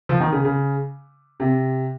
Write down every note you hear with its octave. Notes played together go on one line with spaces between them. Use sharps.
F3
D#3
C#3
C#3
C3